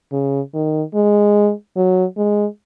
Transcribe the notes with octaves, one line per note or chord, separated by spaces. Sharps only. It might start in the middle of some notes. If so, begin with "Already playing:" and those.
C#3
D#3
G#3
F#3
G#3